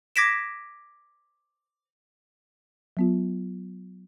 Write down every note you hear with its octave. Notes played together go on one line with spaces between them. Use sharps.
D6 G#6 A#6 B6 D7 E7
F#3 B3 F4